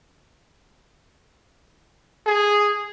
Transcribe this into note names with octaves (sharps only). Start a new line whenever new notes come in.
G#4